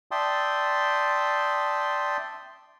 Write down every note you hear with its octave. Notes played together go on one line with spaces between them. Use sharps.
D5 E5 G5 A5 C6 D#6